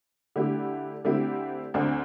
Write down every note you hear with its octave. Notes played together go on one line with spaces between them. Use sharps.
D3 A3 E4 G4
D3 A3 C4 E4 G4
D2 D3 C4